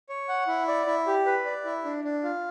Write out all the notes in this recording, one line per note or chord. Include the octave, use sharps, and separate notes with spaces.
C#5
F#5
E4
D5
E4
G4
B4
D5
E4
D4
D4
F4